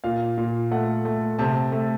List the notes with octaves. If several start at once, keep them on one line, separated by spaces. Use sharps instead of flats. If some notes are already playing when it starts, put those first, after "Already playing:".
A#2 F5
A#2
A3 F#5
A3
C3 A5
A3